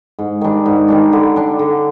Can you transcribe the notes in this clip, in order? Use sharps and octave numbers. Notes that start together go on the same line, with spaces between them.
G#2
D#3 G3 D4
G#2
D#3 G3 D4
D3
G3 D4
D3